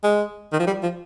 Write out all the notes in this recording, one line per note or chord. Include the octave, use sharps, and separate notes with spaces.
G#3
D#3
F3
G3
F3